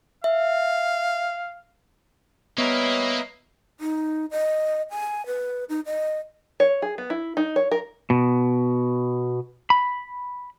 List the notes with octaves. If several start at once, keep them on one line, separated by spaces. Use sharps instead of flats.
E5 F5
G3 A#3 B3 A#4 B4 C#5 D#5 E5
D#4
D#5
G#5
B4
D#4
D#5
C#5
G#4
B3
E4
D#4
C#5
A#4
B2
B5